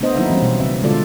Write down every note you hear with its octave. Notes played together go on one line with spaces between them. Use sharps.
A3 B3 D4 C5 D#5
D#3 F#3 A#3 D#4 E4 E5
E3 G3 C4 C#4
B2
C#3 C4 E5
D3 G#3 F4 A4 D5